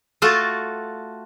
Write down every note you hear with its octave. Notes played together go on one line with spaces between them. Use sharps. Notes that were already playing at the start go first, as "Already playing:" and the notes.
A3 F4 F#4 A4